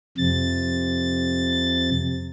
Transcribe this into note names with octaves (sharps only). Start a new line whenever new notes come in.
F2 C3 A6